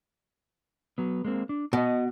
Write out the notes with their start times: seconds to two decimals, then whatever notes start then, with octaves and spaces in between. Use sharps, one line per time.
0.98 F#3 B3
1.25 G#3 A#3 C4
1.49 D4
1.73 B2 F#4 D#5